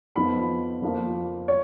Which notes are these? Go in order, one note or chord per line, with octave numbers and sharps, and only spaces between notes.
F2 F3 B3 D#4 B5
F2 F3 A#3
C#5